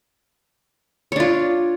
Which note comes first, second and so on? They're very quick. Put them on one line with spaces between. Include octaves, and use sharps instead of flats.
C#5 D4 F4